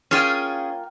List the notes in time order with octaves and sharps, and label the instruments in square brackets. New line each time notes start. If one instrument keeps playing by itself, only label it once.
[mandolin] A#3 F4 G5 [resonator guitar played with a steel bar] C#4 G#4